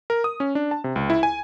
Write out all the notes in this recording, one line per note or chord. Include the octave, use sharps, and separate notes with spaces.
A#4
D#6
C#4
D4
A5
C3
C#2
E4
G#5